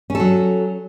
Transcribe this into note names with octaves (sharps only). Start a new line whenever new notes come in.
F#3 C#4 A4